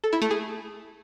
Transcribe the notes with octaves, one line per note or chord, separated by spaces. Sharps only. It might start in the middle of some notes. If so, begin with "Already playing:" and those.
A4
E4
A3
G#4